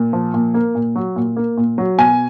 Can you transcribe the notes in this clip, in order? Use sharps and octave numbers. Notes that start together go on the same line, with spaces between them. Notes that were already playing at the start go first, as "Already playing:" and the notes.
Already playing: A#2
F3
A#2
A#3
A#2
F#3
A#2
A#3
A#2
F#3
B2 G#5